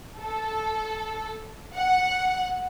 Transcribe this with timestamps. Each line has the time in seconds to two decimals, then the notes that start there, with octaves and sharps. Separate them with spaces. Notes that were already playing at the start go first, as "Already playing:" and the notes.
0.19 A4
1.76 F#5